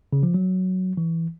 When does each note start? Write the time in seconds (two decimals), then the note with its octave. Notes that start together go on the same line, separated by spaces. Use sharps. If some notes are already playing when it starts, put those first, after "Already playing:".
0.13 C#3
0.23 F3
0.34 F#3
0.97 E3